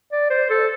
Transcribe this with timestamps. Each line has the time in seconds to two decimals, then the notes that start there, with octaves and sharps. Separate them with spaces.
0.12 D5
0.30 C5
0.50 A4